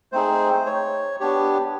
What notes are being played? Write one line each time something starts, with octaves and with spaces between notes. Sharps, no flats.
A3 C4 D#4 G#4 C5
C#5
B3 D4 G4 C#5